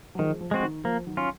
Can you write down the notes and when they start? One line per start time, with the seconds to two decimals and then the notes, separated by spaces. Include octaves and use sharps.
0.15 F#3
0.19 D#3 F3 G#3
0.41 F3
0.51 G#3 C4 F#4
0.63 D#3
0.84 F3 A#3
1.07 D#3 F#3
1.17 C#4 F4